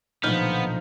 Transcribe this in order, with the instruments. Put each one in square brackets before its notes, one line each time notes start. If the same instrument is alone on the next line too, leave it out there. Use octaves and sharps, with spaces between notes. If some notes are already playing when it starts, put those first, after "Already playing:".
[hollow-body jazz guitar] B1 A#2 D3 [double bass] F3 [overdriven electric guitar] B3 [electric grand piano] D#4 F6 G6